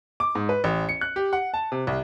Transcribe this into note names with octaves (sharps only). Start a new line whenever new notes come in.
D6
G#2
B4
A1
C#7
F#6
G4
F#5
A5
C3
C2